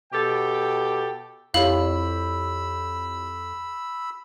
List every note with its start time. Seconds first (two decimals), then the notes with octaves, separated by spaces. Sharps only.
0.13 B2 G4 A4 G5
1.54 F2 E4 G4 C#5 F5 B5 E6 F#7